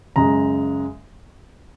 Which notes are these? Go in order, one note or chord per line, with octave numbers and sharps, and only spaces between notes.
F#2 C#3 G#3 A#5